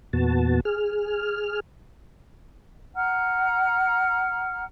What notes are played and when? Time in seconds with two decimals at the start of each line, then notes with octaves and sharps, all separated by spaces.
0.13 E2 A#2 B3 F#4 A5
0.65 G#4 F6
2.95 F#5 A#5 F6